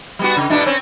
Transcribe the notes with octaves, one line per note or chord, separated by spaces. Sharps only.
G3 B3 F#4
C#3
G#2 B2 D4
C4 C#4